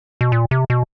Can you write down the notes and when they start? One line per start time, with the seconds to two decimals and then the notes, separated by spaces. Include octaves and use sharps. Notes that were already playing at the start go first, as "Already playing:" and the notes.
0.21 B2
0.32 A#2
0.51 C3
0.70 B2